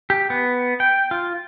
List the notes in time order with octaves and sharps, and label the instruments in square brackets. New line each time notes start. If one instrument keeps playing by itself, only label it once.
[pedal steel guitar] G4
B3
G5
F4